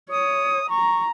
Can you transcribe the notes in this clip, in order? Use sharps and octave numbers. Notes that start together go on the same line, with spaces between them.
C#5 D#6
A#5 C#6